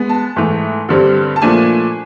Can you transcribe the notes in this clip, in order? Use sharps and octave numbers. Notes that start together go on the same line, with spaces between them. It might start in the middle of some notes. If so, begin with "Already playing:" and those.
Already playing: G#3 B3
A5
G#2 E3 A3
G2 D3 G3 C4
A5
A#2 F3 A3 D4 G#5